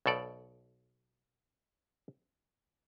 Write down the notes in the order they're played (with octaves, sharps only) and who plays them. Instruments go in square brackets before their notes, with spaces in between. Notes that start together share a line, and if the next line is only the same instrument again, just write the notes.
[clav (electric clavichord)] B1 B2 A4 D5